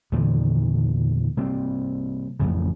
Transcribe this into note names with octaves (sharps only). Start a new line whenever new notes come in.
E2 A#2 D3 D#3
C3 G3 A#3 C4
A1 F2 C#3